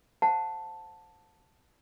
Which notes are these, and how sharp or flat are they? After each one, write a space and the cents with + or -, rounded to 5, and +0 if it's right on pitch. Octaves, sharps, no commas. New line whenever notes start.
C5 +0 F#5 -40 A5 +0